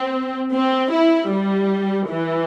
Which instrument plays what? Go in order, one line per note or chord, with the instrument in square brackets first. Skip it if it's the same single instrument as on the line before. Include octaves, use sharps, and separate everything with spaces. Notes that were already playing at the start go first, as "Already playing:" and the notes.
Already playing: [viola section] C4
C4
E4
G3
E3